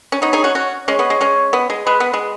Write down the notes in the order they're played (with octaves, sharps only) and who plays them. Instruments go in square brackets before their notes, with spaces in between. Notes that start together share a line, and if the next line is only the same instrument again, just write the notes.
[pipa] C#4
[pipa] B3 D#4 [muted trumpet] C#5
[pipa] D#4 G#4
C#4 F#4
C#4 F#4
[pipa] G#3 C#4 [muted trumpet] C#5
[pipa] B3
G#3
G#3 C#4
B3
G#3
[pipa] G#3 [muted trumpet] B4
[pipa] B3
G#3